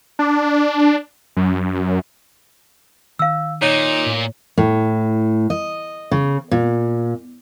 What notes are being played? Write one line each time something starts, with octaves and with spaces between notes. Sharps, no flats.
D4
F#2
D#3 F5 E6
A#2 D#4 C#5
A2
A2
D#5
C#3
A#2